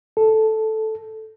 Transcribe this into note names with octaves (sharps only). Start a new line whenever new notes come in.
A4